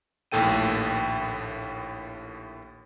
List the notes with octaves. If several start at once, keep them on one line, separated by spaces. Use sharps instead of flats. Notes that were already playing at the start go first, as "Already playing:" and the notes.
A#1 D#2 A2 A4 G5 D#7